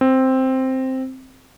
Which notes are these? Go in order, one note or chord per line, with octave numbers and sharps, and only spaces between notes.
C4